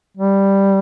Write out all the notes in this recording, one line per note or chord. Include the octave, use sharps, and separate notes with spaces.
G3